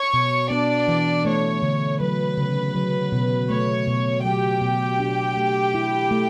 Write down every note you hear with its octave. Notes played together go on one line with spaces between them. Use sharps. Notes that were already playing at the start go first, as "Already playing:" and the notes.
Already playing: C#5 C#6
B2
B3 D4 D5
E3
A3 C#5
D3
F#3 B4
C#3
F#3
B2
A3 C#5
B2
F#3 G4 G5
B2
D4
A3
E4
A3